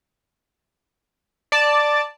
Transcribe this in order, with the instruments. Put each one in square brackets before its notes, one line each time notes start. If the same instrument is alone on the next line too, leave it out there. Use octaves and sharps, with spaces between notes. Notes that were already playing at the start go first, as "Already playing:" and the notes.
[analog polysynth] D5 A5